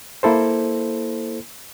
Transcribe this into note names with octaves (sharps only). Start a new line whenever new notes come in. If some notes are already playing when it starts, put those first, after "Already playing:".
A#3 E4 A4 C5